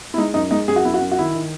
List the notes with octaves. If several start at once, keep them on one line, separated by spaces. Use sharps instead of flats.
E4
G#3 D#4
F#2 D#4
G#3 D#4
F#2 G#4
F#4
F#2 E4
F#4
F#2
F#4
D#3 E4
D#3